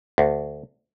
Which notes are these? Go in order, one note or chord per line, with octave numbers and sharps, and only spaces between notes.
D2